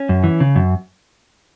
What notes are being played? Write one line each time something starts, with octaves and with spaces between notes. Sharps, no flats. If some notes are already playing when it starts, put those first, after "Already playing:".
Already playing: C#4
F#2
E3
C#3
F#2